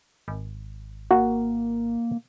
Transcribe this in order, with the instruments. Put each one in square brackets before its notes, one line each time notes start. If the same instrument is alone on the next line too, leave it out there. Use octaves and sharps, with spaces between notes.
[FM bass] G#1
[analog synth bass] A#3 [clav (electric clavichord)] F#4